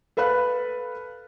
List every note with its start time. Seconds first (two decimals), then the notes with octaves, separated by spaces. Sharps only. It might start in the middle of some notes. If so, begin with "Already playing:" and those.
0.17 A4 B4 F5 B5 F#6